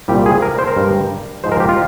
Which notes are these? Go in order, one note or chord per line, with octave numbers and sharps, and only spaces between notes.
C2 A#2 G3 G4
G#4
A#4
C5
A#4
G2 G3
G#2 F3 G#3 C5
A#4
G4
F4